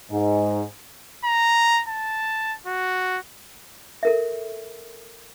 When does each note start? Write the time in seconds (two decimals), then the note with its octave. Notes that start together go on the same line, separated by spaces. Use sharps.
0.11 G#2
1.25 A#5
1.89 A5
2.67 F#4
4.03 A4 A#4 E5